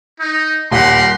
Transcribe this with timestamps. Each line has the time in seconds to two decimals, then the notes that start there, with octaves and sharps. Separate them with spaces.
0.19 D#4
0.71 D#1 A#4 F#5 B5 C6 F#6